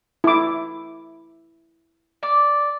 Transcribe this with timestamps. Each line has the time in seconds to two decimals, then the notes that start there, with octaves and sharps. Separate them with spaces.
0.24 E4 D6
2.23 D5 D6